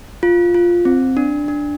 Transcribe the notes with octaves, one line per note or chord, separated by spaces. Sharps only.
F4
F4
C4
D4
D4